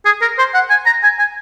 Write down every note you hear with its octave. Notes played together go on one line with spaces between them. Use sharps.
G#4
A#4
C5
F#5
G#5
A#5
G#5
G#5